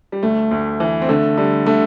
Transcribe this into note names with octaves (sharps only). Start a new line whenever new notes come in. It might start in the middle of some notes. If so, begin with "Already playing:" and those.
G3
D2 A3
D2
E3
C4
D3 A3
D3 G3
D3 A3